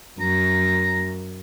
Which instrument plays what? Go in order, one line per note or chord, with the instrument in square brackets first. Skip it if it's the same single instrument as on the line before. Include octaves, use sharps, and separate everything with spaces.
[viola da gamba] F#2 [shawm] A#5